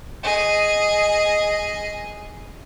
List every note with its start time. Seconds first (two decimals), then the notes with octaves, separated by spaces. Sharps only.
0.23 G#4 D#5